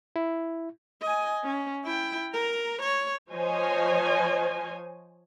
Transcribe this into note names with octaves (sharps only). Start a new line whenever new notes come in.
E4
D#5 G#5
C#4
E4 G5
A#4 A#5
C#5
F3 C5 C#5 D#5 G#5